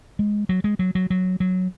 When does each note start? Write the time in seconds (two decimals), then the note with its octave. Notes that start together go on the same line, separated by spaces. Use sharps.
0.19 G#3
0.49 F#3
0.64 G#3
0.79 F#3
0.95 F#3
1.10 F#3
1.40 F#3